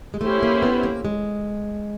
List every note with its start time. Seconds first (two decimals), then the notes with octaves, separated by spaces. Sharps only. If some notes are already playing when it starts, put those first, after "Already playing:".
0.14 G#3
0.21 A3 C#4 E4 G4 C5
0.43 A#3
0.63 B3
0.83 A#3
1.05 G#3